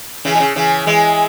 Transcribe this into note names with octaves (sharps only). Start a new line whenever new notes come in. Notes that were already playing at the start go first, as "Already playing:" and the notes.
C#3 E3
B2
C#3
C#3 E3
E3 G#3